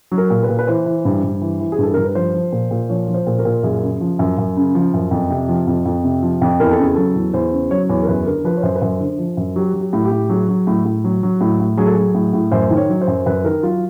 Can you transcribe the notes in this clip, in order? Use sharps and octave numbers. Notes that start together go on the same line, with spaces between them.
F#3
A#4
A#2
B4
A#2
B4
E3 C5
E3
G2
G2
E3
E3
G#4
G2 A4
G2 A#4
B4
F3 C5
F3
A#2
A#2
F3 C#5
F3
C5
A#2
A#4
A#2
F#2 G#4
C#3
F3
F#2
F#2
C#3
F3
F#2
F2
C3
F3
F2
F2
C3
F3
F2
E2 A#4
A4
C#3 G#4
F#3 A4
E2
E2 C5
C#3
F#3 C#5
E2 C#5
A#4
F#2 B4
D3 A#4
F3 B4
C#5
F#2 C5
B4
F#2 C5
D3
F3
F#2
F#3 G4
F#3
G4
A2
G4
A2
F#3 G#4
F#3
A2
A2
F#3
F#3
A2
A2
F#3 G#4
A4
F#3 G#4
A2
A2
F#2 C5
D#3
C#5
F#3
C5
F#2
F#2 B4
D#3 A#4
F#3 F4